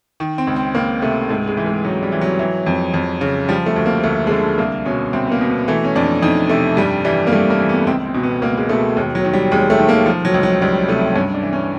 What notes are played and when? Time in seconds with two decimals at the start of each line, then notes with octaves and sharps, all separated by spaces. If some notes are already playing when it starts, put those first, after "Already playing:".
0.20 D#3
0.38 C4
0.47 C#2
0.56 C4
0.75 C#2 A#3
1.02 C3 A3
1.29 G#2 A3
1.48 G#3
1.57 E3
1.66 G#3
1.85 G#2 F#3
2.03 G3
2.12 E3
2.21 F#3
2.39 E3
2.66 F2
2.94 F2
3.21 C#3
3.49 F3 G3
3.66 A3
3.76 D2
3.86 A#3
4.04 D2 A3
4.27 G#3
4.31 D3 A3
4.58 C2 A#3
4.85 B2 C#4
5.13 C2 C4
5.27 B3
5.32 A#3
5.41 B2
5.50 B3
5.68 E3 A3
5.84 C#4
5.95 F2 D4
6.22 F2 D#4
6.50 C3 A3
6.77 G2 G3
7.05 E3 G3
7.27 A#3
7.32 G2 A3
7.50 A#3
7.60 E3
7.69 B3
7.87 C#2 C4
8.05 C4
8.14 B2
8.23 B3
8.41 C#2 A#3
8.57 G#3
8.69 B2 A3
8.96 D#2 G#3
9.15 F#3
9.24 D#3
9.33 G3
9.52 D#2 G#3
9.70 A3
9.79 D#3
9.89 A#3
10.06 F3
10.25 F#3
10.34 C#2
10.43 F#3
10.62 C#2 G3
10.88 C3 A3
11.16 G2 C#4
11.34 D4
11.43 E3
11.53 C#4